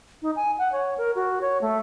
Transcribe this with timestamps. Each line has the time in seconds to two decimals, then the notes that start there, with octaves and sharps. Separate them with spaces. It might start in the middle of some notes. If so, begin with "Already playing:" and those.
0.22 D#4
0.36 G#5
0.58 F#5
0.72 C#5
0.98 A#4
1.15 F#4
1.41 C#5
1.61 A3